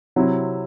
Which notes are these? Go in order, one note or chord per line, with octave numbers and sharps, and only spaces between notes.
C3 F#3 C4 E4